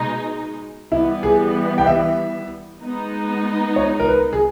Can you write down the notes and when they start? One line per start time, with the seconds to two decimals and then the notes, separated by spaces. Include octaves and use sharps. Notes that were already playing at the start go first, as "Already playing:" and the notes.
Already playing: B2 G#3 D#4
0.91 E3 G3 B3 E4
1.23 G#4
1.78 G5
1.86 E5
2.81 G#3 B3 D#4
3.76 C#5
4.00 A#4
4.08 B4
4.33 G#4